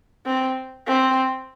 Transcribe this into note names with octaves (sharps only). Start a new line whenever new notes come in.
C4
C4